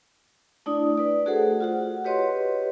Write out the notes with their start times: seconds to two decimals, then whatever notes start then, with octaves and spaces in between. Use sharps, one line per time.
0.66 A3 D4 E4 D5 D#6
0.97 B4 D5
1.26 A3 F#4 G#4 A4 C5 F#5
1.60 F4 F#4 F#5
2.04 G4 B4 C#5 D#5 C6